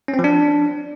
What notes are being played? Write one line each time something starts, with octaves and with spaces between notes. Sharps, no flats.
C#4
C4
F3
D4